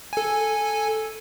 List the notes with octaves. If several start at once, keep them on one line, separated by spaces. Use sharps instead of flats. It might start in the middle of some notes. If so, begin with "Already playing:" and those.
A4 G#5